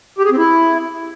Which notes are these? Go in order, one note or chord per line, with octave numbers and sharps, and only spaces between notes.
G4
G#4
C4
E4